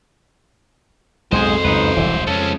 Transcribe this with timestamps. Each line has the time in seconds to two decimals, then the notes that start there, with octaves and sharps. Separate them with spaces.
1.32 B1 F2 G#2 F#3 G#3 G#4 C5
1.65 C#2 F#2 D#4 B4
1.96 E1 C2 E3
2.27 F2 G#3 C#4 A4